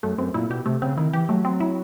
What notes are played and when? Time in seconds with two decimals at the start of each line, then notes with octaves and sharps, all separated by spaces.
0.03 F#2 A3
0.18 F#2 C4
0.34 A#2 E4
0.50 B2 G4
0.66 C3 A3
0.82 C#3 C4
0.97 D#3 E4
1.13 E3 G4
1.29 F#3 A3
1.45 C4
1.60 E4